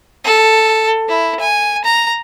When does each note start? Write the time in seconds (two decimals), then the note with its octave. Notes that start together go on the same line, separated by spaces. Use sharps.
0.24 A4
1.08 E4
1.40 G#5
1.84 A#5